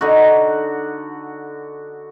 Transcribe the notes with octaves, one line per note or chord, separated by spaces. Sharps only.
D3 D#4 F#4